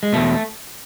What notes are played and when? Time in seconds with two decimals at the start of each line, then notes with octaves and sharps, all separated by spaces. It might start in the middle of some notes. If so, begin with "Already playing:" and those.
0.03 G#3
0.13 E2 B2 A3